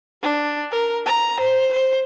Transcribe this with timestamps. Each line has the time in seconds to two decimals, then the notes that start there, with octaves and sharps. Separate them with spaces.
0.23 D4
0.72 A#4
1.06 A#5
1.40 C5
1.73 C5